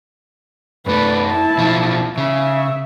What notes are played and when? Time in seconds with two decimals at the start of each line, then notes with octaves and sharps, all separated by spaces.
0.86 F#2 A3 B4 D5
1.28 E4 A5
1.59 B1 F3
2.18 C#3 E5